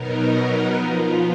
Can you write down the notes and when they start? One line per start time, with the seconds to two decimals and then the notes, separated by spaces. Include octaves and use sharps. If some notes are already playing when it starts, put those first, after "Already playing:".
Already playing: B2 F#3 B3 D#4 A#4
0.74 F3 B3 F4